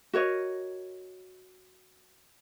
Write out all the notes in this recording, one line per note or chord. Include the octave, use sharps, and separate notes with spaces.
F#4 A#4 C#5 D#5